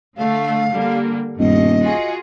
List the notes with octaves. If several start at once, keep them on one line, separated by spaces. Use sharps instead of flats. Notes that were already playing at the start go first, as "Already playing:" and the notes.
D3 A3 F5
D3 G3 A#3
D#1 G2 B2 D#5
F4 F#4 G#4